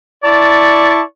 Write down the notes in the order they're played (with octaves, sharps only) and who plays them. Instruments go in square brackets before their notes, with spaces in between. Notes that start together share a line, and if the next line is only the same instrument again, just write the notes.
[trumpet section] E4 A5 C#6 [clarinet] D5